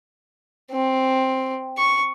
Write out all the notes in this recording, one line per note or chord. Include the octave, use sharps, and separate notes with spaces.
C4
C#6